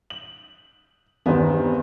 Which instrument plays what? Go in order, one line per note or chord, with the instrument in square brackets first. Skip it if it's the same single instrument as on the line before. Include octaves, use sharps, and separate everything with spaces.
[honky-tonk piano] F#7
[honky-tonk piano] E2 G2 D#3 [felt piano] B3 C4